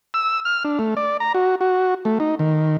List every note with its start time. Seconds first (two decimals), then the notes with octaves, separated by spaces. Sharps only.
0.14 E6
0.45 F6
0.64 D4
0.79 A3
0.97 D5
1.20 A#5
1.34 F#4
1.61 F#4
2.05 A3
2.20 D#4
2.39 D#3